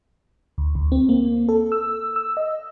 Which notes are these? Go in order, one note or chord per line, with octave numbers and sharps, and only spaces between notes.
D2
D2
C4
A#3
A4
E6
E6
D#5